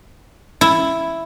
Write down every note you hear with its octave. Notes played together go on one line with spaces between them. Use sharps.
E4